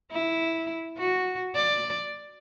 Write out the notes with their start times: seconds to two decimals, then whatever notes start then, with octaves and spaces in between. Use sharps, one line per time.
0.11 E4
0.98 F#4
1.55 D5